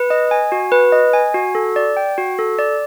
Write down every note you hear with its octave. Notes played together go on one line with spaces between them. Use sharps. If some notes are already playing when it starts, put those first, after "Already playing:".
Already playing: B4
D#5
G#5
F#4
B4
D#5
G#5
F#4
A4
D5
G5
F#4
A4
D5